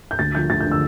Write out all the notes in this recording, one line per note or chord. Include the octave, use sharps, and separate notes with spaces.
G6
D2 A6
D3 F3 G6
D2 A6
G6
D3 F3
E6